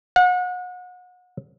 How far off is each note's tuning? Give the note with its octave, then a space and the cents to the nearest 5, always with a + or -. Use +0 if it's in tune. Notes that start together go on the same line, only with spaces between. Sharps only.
F#5 -35